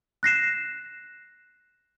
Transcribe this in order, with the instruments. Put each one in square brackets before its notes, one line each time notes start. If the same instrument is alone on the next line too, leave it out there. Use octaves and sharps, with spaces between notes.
[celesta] F#6 A#6 C7 E7